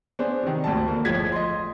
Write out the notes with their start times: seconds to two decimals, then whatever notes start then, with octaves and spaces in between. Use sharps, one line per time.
0.19 B3 D4 G#4 C5
0.43 C3 D#3
0.64 G#1 D2 A5
0.88 D3 A#3
1.05 G1 A2 F3 G#3 G#6 B6
1.32 D#5 C6